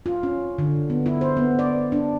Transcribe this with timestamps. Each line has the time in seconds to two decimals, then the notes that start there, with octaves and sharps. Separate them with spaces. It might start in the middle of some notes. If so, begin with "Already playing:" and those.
0.06 F4
0.23 C#4
0.58 D3
0.90 B3
1.06 E4
1.21 C5
1.37 B3
1.59 D5
1.92 D4